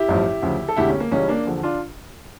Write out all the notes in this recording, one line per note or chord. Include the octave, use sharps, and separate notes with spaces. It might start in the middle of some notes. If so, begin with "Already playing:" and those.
Already playing: E4 G4
A1 G2 F3
D2 C#3 F3
A4
E1 D2 D3 E4 G4
C#4
A#3
C#2 C#3 E3 G3 C#4
A#3 D4
E2 D3 F3
D4 F4